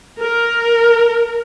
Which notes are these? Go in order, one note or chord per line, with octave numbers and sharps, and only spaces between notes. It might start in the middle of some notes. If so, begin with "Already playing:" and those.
A#4